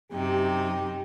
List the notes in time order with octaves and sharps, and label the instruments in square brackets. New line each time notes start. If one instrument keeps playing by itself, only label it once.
[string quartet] F#2 C3 D#4 [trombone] G4